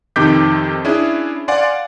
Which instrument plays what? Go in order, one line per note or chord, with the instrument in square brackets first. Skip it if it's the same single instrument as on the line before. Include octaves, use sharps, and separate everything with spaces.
[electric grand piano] F2 C3 D#3 D6 G6 B6
C#4 D4 E4 G#4
D5 F5 F#5 G#5 C6